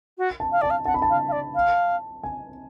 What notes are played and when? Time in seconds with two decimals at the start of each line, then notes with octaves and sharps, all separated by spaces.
0.18 F#4
0.40 A5
0.52 F5
0.61 D5 A5
0.70 F5
0.85 F#5 A5
0.94 B5
1.02 A5
1.10 F5
1.28 F5
1.32 D5
1.55 F5
2.23 G#5